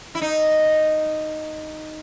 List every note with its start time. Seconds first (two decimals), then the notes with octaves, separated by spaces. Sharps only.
0.15 E4
0.21 D#4